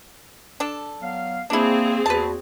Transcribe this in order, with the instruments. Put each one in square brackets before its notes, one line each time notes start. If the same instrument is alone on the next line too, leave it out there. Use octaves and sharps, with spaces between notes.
[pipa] D4 A4
[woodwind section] F#3 B3 F5
[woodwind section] A#3 [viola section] C4 G#4 [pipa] D4 E4
[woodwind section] E2 A#3 F#4 [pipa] B4 A5